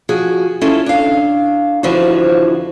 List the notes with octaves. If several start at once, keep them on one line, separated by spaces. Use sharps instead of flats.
F3 F#4 G#4
C#4 E4 F4 A4
D4 F5
F2 D3 E3 F3 C4 F#4